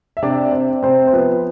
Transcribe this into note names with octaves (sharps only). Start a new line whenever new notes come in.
E5
C3 D4 D5
C4
C3 C4 C5
C5
F3 B3 B4